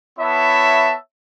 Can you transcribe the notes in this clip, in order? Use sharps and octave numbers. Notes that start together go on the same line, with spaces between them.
B3 E4 C#5 E5 A5